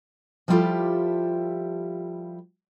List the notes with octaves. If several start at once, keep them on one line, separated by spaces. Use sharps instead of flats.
F3 G3 E4 F4 G4 A4